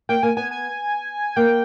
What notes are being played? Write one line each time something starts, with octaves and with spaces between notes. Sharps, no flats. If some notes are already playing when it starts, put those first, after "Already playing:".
A#3 G5
A#3 G#5
B3 G#5
G#5
A#3 G5